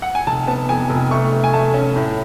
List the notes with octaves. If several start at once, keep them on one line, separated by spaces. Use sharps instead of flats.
F#5
G#5
F1 A5
B3 A5
F2 G#5
F1
A3 C#6
A3
G#5
A3 A5
C#4
A2